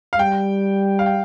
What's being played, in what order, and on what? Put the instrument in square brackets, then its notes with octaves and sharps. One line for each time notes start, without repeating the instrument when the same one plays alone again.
[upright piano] F5
[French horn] G3 [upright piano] G5
[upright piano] F5
G5